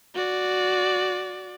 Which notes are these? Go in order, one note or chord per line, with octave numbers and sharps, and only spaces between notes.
F#4 D5